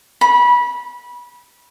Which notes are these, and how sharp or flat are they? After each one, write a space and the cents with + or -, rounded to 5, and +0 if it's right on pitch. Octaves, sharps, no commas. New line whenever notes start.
B5 -25